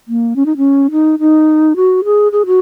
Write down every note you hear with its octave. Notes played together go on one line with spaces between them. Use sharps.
A#3
C#4
D#4
C#4
D#4
D#4
F#4
G#4
G#4
F#4